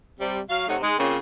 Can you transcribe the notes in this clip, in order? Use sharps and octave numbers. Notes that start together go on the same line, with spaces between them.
C3 G3
F#3 F#4 F5
C3 A3 D#4 C#5 F#5
G#3 D#4
C#3 A#3 C4 C#4 F4